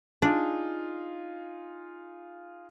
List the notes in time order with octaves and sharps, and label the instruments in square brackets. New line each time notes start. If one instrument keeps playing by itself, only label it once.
[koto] D4 [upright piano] D#4 F4 G#4